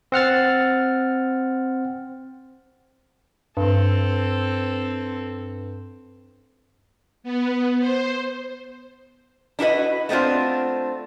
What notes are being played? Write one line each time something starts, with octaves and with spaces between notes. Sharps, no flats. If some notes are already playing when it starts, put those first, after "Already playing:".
C4 F#5 F6 A6
G2 C4 A4
B3
C5
D4 E4 F#4 B4 D#5
A3 B3 C4 D4 F4